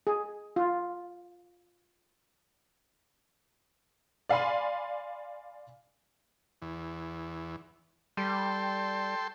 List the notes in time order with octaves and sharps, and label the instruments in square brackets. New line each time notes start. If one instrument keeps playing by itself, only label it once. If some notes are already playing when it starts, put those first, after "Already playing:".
[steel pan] G#4
F4
[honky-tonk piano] D5 F5 G#5 B5 C6
[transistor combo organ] E2
[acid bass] G3 [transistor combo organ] A4 G5 C6